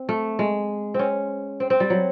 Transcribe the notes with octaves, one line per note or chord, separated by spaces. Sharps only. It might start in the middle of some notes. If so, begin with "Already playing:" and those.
Already playing: C4
A3
G#3
C4 C#4
C4
C4
G3
F#3